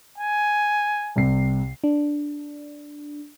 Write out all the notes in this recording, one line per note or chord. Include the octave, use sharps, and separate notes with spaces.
G#5
C2 C3 C7
D4